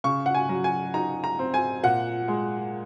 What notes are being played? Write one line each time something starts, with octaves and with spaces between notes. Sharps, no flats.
C#3 C#6
F#5
G#5
F#3
G#5
D#4 A#5
A#5
C4
G#5
A#2 F#5
G#3